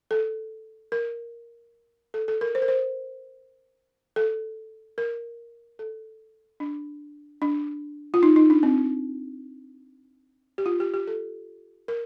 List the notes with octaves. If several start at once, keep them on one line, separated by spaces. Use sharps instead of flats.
A4
A#4
A4
A4
A#4
C5
A#4
C5
A4
A#4
A4
D4
D4
F4
D#4
D#4
D4
C4
G4
F4
G4
G4
A4
A#4